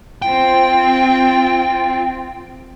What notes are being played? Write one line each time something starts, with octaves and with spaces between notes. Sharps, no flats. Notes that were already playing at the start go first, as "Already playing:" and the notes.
C4 F4 G5